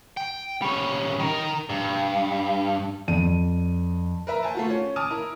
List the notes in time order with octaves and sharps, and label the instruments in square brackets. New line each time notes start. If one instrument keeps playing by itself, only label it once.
[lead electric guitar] G5
G3 C#4
D#3 A#4
G2
[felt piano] F2 D5 D#7
[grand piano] A#4 B4 E5 A#5
C5 G#5 A5
A3 F4 F#4
C#4
G#5 A5 D6 D#6 F6 D#7
E4 A#4